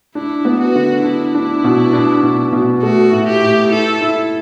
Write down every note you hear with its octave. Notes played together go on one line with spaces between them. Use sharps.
D4 E4
B3
F#4
D3
D4 E4
D4
B2
D4
B2
B2
A3 F#4
A2
G4
A2
E4 A4
E4